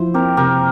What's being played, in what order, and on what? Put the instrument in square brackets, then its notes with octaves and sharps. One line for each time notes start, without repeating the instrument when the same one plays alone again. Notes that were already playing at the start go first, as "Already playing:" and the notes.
Already playing: [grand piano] F3 E4 [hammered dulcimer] C5
[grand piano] C4 [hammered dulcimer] G4 A#4
[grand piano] C3 [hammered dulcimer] G4 A#4